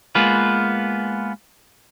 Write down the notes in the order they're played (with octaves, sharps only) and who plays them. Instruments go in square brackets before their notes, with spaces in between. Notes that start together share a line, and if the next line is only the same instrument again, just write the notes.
[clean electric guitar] G#3 A#3 B3 F4 B4